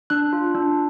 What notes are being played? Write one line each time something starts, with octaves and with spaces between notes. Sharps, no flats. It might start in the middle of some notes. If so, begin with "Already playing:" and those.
D4 F#6
F4
D4